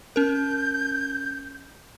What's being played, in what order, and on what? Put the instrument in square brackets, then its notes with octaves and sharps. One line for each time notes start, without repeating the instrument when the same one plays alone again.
[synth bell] C#4 A#4 [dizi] G6